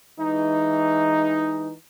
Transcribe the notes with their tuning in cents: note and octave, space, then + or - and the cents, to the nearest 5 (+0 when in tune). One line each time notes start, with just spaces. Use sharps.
E3 -5 G#3 +0 D#4 +0